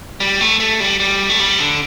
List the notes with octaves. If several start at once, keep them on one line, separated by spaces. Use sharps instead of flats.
G3
A3
A3
G3
G3
A3
G3
D3